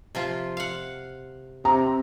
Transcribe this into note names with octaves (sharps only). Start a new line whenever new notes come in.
C3 F3 F4
F5 F#5
C3 C4 A#5